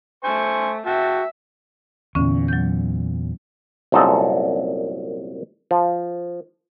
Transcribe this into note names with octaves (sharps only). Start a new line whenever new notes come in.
A3 C5 G#5 C#6
F#4 E5 G5 A5
E2 A#2 D3 C#4
F#3 G6
C2 F#2 A#2 D#4 A4
F3